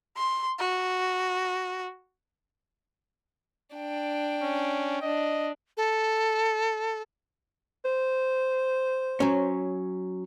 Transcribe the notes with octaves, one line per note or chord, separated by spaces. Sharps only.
C6
F#4
D4 G5
C#4
D4 D#5
A4
C5
F#3 C#4